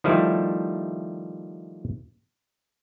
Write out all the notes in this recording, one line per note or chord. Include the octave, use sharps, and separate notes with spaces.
D#3 F3 G3 A3 E4